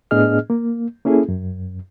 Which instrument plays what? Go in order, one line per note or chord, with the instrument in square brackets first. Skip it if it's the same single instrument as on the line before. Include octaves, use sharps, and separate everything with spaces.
[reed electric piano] A2 B3 D4 G#4 D#5 F6
A#3
A#3 C#4 E4 G#4 A4
F#2